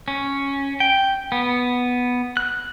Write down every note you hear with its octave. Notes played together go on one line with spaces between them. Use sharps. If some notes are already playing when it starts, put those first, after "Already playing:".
C#4
G5
B3
F#6